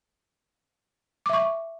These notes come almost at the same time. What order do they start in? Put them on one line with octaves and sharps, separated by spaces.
D6 E5 C#6